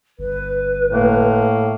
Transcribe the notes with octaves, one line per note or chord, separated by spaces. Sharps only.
G1 B4
A2 A#3